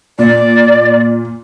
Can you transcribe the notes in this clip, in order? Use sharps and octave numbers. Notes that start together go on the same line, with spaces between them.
A#2 D5